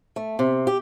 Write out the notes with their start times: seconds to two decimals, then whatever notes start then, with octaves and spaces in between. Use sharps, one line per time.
0.16 A3
0.39 C3
0.67 G4